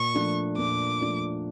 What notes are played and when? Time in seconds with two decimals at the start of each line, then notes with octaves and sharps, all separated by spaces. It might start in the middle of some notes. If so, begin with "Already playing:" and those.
Already playing: A#2 C#6
0.14 F3 A3 D4
0.58 A#2 D6
1.01 F3 A3 D4